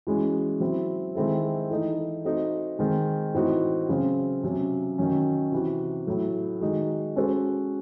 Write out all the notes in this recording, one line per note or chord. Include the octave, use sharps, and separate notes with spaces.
E3 G#3 C#4 F#4
F#3 C4 E4
D#3 G#3 C4 E4 A4
E3 A3 D#4
A3 C4 D#4 F#4
D#3 G#3 C4
A2 E3 C4 D#4 F#4
C#3 F#3 C4
C3 F#3 C#4
D#3 F#3 C#4
C3 E3 C4 F#4
A2 F#3 A3
D#3 G#3 D#4 F#4
G#3 C#4 F#4 A4 C5